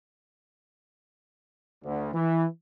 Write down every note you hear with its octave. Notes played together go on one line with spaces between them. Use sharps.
D2
E3